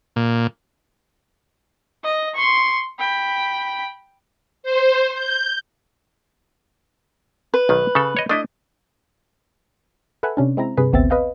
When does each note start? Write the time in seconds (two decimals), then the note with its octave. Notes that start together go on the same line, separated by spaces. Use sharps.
0.16 A#2
2.04 D#5
2.34 C6 C#6
2.99 G5 B5
4.63 C5
5.12 G6
7.54 B4
7.69 B1 D#3
7.95 C#3 A4
8.16 C#5 D#5
8.29 A3 D4 E4 D#5
10.23 A4 B4 E5 F#5 G#5
10.37 C3 C#4 D4
10.57 G#3 C4 E4 A#5
10.77 G2 C3 G#4 B4 B5
10.93 G#1 D2 B3 C4 E5 A6
11.10 B4 D#5 F5 G5